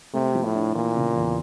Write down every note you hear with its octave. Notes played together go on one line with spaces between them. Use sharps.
C3 A3
F3
A2
D4
A#2 E3
C#3
E2